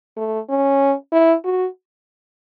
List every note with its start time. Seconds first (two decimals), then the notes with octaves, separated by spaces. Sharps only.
0.17 A3
0.49 C#4
1.12 E4
1.44 F#4